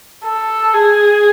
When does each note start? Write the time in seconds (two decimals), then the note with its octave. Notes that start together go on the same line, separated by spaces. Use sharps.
0.25 A4
0.73 G#4